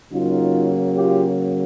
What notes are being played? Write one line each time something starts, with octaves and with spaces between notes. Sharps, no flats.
C#3 F#3 A#3 D#4 F4
F4 G4